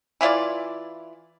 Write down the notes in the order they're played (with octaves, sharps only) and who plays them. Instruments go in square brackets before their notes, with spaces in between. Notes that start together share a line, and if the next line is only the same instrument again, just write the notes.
[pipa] E3 E4 F4 D5